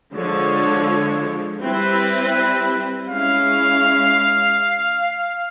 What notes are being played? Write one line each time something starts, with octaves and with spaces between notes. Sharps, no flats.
D3 F3 G#3 C#5
G3 C4 E4 B4
G#3 C#4 E4 F5